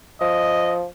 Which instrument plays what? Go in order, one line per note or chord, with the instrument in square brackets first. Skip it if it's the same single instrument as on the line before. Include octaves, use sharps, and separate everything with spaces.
[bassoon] F3 [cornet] D#5